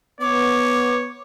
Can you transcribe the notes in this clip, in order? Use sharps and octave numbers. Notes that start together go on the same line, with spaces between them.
B3 C#5 D6